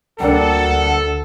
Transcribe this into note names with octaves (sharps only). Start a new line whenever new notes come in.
D2 G3 A#3 D4 A4 F#5